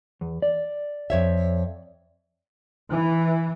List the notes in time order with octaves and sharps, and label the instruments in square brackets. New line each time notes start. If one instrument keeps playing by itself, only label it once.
[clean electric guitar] E2
D5
[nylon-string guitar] F2 C#5 E5
[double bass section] E3